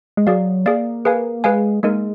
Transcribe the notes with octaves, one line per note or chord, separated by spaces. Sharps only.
G#3
F#3 G#4 D5 F5
A#3 G#4 D5 F5
G#4 B4 F5 G#5
G#3 G#4 B4 F5 G#5
G#3 A#3 D#4 A#4